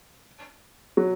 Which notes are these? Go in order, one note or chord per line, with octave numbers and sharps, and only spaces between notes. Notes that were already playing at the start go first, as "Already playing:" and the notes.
F#3